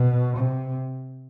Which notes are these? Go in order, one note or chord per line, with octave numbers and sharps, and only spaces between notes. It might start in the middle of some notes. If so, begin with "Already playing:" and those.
Already playing: B2
C3